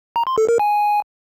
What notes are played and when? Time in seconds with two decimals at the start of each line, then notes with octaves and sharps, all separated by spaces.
0.16 A#5
0.27 C6
0.38 A4
0.49 A#4
0.59 G#5